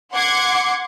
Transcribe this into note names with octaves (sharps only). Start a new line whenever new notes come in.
F#5 C6 D6 G#6 C7 C#7